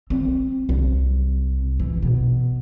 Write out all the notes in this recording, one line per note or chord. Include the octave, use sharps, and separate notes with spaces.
C4
C2
E3
B2